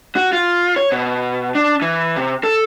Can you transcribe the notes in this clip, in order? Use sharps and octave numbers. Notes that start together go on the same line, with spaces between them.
F#4
F4
C#5
B2
D4
E3
C3
A4